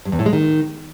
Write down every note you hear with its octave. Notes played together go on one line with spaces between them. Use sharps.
G2
E2
A2
G#3
D#3